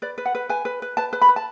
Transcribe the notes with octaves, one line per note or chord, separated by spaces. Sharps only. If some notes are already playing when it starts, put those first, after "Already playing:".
B4 D5
B4
F#5
B4
B4 G#5
B4
B4
B4 A5
B4
B5
B4
A5